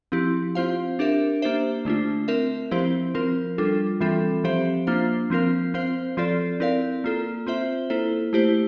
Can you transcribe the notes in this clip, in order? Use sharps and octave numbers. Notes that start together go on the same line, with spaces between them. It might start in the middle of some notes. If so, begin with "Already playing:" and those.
F3 C4 E4 G4
C4 F4 C5 F5
D4 G4 A#4 E5
A#3 D4 G4 C5 E5
D3 A3 D4 F4
C4 F4 A#4 E5
F3 C4 E4 G4 C5
F3 C4 F4 A#4
G3 D4 F4 A4
E3 G3 C4 F4 A4
F3 C4 G4 C5 E5
A#3 D4 F4 C5 F5
F3 C4 F4 A#4 F5
C4 F4 C5 F5
F3 C4 F4 A4 D5
C4 E4 A#4 D5 F5
A#3 F4 A4
C4 F4 C5 E5
A#3 E4 A4 C5
A3 E4 G4 C5